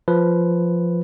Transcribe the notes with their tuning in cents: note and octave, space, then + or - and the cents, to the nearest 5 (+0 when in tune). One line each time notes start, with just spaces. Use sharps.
F3 -5 B4 +0